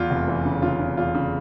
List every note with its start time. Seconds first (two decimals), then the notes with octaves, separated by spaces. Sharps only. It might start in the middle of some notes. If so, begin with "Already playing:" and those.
Already playing: E2 F4
0.10 F1
0.28 E3
0.46 C#3
0.62 C#3 F4
0.80 C#3
0.97 E2 F4
1.15 C#3